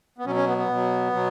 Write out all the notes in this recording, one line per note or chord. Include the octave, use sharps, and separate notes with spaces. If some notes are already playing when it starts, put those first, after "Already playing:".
B3
B2 F#3 C#4
C#4
B3
B3
B2 F#3
B2 F#3